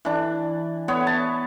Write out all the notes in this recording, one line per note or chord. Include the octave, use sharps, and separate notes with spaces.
E3 D4
B3 C#5
A5